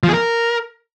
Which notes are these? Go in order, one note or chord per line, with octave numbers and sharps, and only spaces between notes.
F3
G#4
A#4